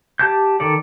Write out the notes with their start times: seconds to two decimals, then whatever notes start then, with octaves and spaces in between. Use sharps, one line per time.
0.19 G4 A5 G6
0.60 D#3 A4 D5